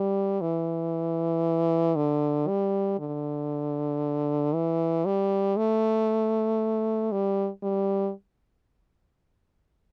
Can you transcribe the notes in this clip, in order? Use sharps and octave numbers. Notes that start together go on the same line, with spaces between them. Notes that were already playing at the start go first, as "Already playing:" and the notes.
Already playing: G3
E3
D3
G3
D3
E3
G3
A3
G3
G3